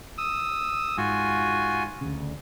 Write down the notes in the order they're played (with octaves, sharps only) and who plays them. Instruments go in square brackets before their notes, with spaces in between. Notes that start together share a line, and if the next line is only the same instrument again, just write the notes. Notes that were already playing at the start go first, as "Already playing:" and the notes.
[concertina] D#6 E6
[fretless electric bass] G#2 [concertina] F4 F#4 G#5
[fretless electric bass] D2 C#3